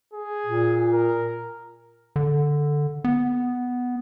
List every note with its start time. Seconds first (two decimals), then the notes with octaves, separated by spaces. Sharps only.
0.13 G#4
0.46 A#2
0.93 A#4
2.16 D3
3.04 B3